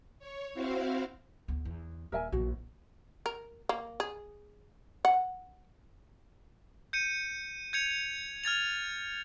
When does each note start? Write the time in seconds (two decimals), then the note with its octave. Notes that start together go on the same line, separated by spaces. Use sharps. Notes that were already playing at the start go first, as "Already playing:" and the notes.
0.19 C#5
0.54 C4 E4 F#4 C5 F5
1.48 D2 B3
1.65 E2
2.12 D#1 A#4 E5 G#5
2.32 A#1 E2 F#4
3.26 A#4
3.69 A#3
4.00 G#4
5.05 F#5
6.93 G6 C#7 D#7
7.73 G6 G#6 C#7 F7
8.44 F6 G#6 A6 F7